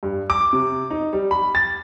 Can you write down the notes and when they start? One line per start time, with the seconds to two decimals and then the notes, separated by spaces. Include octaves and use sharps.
0.03 G2
0.30 D6
0.53 C3
0.90 D#4
1.13 G3
1.31 B5
1.55 A6